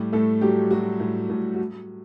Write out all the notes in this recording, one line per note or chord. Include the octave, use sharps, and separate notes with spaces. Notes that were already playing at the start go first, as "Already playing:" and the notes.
Already playing: A2 G3 G4
A2 A3 A4
F#3 G3 G4
F#3 F#4
A2
A2
F#4